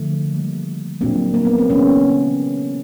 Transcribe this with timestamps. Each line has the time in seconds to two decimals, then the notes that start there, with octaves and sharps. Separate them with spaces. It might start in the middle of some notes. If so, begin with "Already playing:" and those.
Already playing: D3 F3 A3
0.33 D#3 G3 A#3
1.01 A#2 F#3 A#3 C4 D4
1.34 A#3
1.45 B3
1.58 C4
1.70 C#3 E3 G#3 B3 C#4